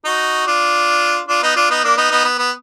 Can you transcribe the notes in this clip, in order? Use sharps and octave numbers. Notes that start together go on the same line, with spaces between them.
D#4 F#4
D4 F4
D4 F4
B3 D#4
D4 F4
B3 D#4
A#3 D4
B3 D#4
B3 D#4
B3
B3